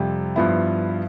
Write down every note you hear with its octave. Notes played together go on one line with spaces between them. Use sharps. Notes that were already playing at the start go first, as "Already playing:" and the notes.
Already playing: F2 C3 G3
G2 F3 B3 E4